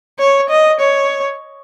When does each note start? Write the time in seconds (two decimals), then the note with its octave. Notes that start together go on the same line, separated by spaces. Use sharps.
0.19 C#5
0.50 D#5
0.80 C#5